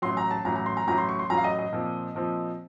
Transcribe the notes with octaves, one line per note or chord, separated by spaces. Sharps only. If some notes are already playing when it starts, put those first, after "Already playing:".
A1 A2 F#3 C6
A#5
A5
A1 A2 F#3 A#5
A#5
C6
A#5
A1 A2 F#3 A#5
C6
C#6
C6
A1 A2 F#3 A#5
F5
D#5
D#5
A#2 F3 C4
A#2 F3 C4